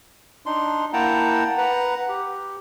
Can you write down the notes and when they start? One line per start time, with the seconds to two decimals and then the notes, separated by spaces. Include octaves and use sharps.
0.46 D4 D#4 C6
0.93 A#3 E4 F#5 G5 A5 A#5
1.58 B4 F#5 A#5
2.09 G4